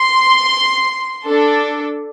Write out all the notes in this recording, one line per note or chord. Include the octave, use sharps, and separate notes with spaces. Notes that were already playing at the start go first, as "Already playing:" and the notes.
Already playing: C6
D4 A4